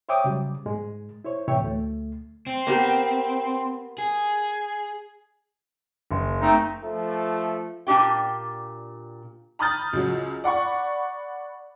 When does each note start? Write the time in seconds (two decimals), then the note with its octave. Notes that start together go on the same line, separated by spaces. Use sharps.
0.09 C5 C#5 E5 G5 D6 D#6
0.24 C#3 F#3 G3
0.66 G#2 G#3
1.24 E4 C5 C#5
1.48 A2 C3 E3 C#5 E5 G5
1.61 D2 A3
2.47 C4
2.67 A#3 B3 G4
3.98 G#4
6.11 F#1
6.41 A3 C4 D#4
6.84 F3 A3
7.87 A#2 D4 G4 G5
9.59 A#5 B5 D#6 F6 G6 A6
9.93 C#2 F#3
10.44 D5 F#5 B5 C#6